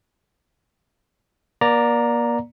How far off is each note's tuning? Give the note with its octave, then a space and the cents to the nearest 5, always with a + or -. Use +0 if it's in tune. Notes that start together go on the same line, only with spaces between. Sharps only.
A#3 +35 D5 +0 A#5 +0